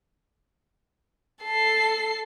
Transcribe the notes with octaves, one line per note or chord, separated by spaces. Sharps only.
A4 C7